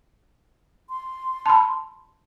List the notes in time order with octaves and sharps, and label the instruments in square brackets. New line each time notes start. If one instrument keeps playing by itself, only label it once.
[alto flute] C6
[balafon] A5 B5